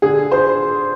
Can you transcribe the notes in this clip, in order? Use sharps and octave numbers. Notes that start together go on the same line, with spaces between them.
D3 G#4
C5